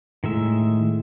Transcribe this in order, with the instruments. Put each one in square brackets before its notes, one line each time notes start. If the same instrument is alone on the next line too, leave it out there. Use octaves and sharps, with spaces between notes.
[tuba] A2 [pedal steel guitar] D#3 G#3 E5